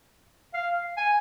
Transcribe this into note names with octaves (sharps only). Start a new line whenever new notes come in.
F5
G#5